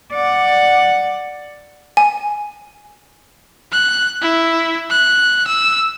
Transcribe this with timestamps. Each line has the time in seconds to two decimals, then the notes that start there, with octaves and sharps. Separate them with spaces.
0.13 D5 F#5
1.97 G#5
3.72 F#6
4.21 E4
4.90 F#6
5.47 E6